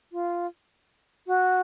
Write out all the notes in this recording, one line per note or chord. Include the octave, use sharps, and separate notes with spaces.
F4
F#4